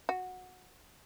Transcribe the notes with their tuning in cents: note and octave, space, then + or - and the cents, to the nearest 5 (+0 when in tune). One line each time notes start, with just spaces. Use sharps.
F#4 -15